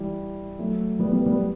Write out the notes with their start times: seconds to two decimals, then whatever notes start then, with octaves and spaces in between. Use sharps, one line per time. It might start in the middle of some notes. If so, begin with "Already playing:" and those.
Already playing: E3 G3
0.59 F#3 A3
0.99 G3 B3
1.13 G3 B3
1.26 G3 B3